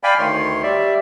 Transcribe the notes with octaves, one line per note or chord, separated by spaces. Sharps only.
D5 F5 G5 G#5 B5
D2 D#3 C#5 C6
G3 D5 E5